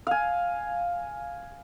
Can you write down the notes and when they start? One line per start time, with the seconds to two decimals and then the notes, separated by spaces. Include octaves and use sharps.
0.07 F5 G#5